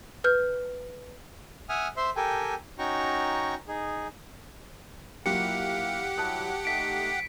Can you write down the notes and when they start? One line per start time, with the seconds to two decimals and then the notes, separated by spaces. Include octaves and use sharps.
0.24 B4 F6 G6
1.69 E5 F#5 G#5 D#6 F6
1.97 C5 E5 C6
2.16 G4 A4 A#4 G5 G#5
2.78 C#4 D#4 F#4 G5 A#5 C#6
3.68 D#4 G#4
5.26 F#3 A#3 E4 F4 G4 F5 F#5 C#7
6.18 G2 F#3 E4 A5 D#6 F#6
6.65 A3 D#4 B6 D7